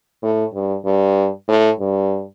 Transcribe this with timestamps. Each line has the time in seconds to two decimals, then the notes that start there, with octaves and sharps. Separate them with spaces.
0.23 A2
0.54 G2
0.85 G2
1.48 A2
1.80 G2